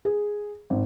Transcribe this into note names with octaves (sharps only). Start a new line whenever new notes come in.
G#4
G#1